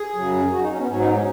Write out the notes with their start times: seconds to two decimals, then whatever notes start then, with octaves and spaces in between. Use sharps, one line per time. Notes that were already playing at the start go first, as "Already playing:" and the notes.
Already playing: G#4
0.16 F#2 C#3 F#3
0.52 F#4
0.60 D#4
0.70 C#4
0.79 B3
0.88 G#2 F#3 C#4
0.99 D#4
1.12 C#4